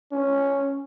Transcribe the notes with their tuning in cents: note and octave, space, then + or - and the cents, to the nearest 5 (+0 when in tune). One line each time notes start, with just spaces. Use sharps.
C#4 +0